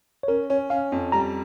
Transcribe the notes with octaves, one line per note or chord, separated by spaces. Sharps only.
C#5
C#4 A#4
C#4 C#5
C#4 F5
F2
G3 A#5